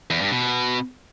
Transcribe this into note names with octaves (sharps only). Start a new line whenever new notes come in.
E2
G2
B2